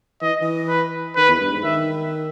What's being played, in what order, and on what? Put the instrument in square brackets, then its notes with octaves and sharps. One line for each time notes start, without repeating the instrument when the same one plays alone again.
[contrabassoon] E3 [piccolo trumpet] D#5
[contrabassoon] E3
[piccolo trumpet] B4
[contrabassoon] D#3 [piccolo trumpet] B4
[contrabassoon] E2
G2
G#2
[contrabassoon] D#3 [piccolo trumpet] E5